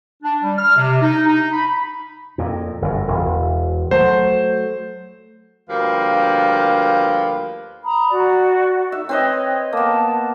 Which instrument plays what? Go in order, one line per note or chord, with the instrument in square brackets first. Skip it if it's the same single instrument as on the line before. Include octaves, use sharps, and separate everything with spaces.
[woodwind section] D4
G3
F6
C3
D#4
D#4
B5
[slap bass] F2 A#2
G1 F#2
E1
[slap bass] F#3 A3 [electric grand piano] C5
[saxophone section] D2 F3 G3 A#3 B4 F5
[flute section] A#5 B5 D#6
F#4 D5
[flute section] D#4 [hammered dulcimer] E5
[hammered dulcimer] C4 B4 D#5 [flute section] C#5
[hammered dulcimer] A#3 B3 [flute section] A5